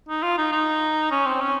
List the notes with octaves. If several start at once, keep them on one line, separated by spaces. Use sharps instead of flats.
D#4
F4
D#4
D#4
C#4
C4
C#4